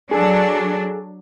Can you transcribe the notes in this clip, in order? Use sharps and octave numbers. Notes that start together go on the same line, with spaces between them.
F#3 D4 G#4 A4